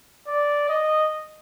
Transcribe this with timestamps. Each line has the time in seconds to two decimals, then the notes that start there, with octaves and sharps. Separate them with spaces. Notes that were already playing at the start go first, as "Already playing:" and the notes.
0.28 D5
0.69 D#5